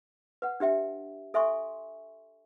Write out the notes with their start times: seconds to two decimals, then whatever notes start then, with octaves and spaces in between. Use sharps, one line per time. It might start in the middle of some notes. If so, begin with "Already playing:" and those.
0.42 B4 F#5
0.60 D4 G4 E5 G5
1.34 A4 E5 G#5 C6 C#6